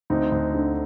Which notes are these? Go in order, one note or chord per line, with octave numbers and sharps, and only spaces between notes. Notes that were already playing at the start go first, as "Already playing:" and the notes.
D2 C4 D#4
D2
D3